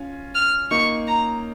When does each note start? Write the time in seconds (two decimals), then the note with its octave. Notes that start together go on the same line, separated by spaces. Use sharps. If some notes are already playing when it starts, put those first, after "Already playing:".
Already playing: C#4 F4
0.35 F6
0.71 A#3 D#4 C#6
1.07 A#5